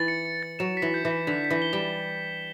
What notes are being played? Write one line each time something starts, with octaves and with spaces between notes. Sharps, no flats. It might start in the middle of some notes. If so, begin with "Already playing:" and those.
Already playing: E3 A6
C#7
C#7
A6
F#3 E7
B6
E3
G6
E3
B6
D3 B6
B6
E3
G7
G3 E7